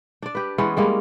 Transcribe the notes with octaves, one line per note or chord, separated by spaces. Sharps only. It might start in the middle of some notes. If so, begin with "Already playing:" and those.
D4 D5
G4 B4
E3 G#3 B3 C#4
G3 G#3 A#3